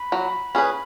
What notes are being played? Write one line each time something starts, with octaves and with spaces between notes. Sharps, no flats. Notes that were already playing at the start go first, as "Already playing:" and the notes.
Already playing: B5
F#3
C#4 G#4 B4